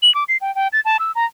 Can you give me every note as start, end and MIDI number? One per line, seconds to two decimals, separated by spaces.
0.02 0.13 102
0.15 0.24 86
0.28 0.37 96
0.41 0.54 79
0.55 0.68 79
0.73 0.80 93
0.85 0.97 81
0.99 1.12 88
1.15 1.25 82